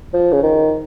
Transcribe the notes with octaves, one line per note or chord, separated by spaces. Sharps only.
F3
C#3
D#3